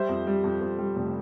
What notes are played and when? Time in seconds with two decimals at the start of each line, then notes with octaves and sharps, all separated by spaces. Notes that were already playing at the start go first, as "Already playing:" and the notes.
Already playing: G3 C5 E5
0.09 F2
0.27 G3
0.44 F2
0.61 F2
0.78 G3
0.96 F1